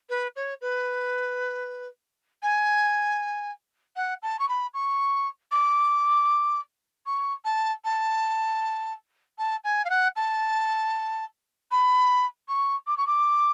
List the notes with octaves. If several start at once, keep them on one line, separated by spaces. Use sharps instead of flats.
B4
C#5
B4
G#5
F#5
A5
C#6
B5
C#6
D6
C#6
A5
A5
A5
G#5
F5
F#5
A5
B5
C#6
D6
C#6
D6